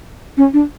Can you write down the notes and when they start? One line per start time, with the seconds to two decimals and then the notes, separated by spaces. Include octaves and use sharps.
0.37 C#4
0.53 D4